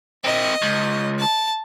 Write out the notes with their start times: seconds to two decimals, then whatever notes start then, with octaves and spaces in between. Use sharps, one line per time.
0.25 C4 A#4 D#5
0.62 C#2
1.19 A5